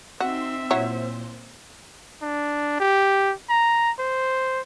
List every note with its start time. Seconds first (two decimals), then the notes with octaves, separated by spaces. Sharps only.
0.20 C4 D#4 F#4 E5 C6
0.71 A#2 F#3 E4 C5 C#5
2.22 D4
2.80 G4
3.49 A#5
3.99 C5